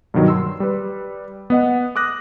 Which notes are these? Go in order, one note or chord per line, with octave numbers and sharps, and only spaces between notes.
G2 B2 D#3 F#3
C6 E6
G3 B4
B3 D#5 F#5
D6 D#6 F#6 A#6